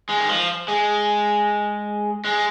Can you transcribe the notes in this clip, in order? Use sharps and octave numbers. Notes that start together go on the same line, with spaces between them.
G#3
D#3
F3
G#3
G#3